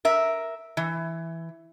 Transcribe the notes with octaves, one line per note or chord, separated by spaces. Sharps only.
A#4 E5
E3